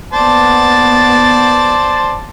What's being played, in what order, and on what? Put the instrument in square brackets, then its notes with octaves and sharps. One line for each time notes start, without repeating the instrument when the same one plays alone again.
[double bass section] D#2 B3 [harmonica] C5 D5 A5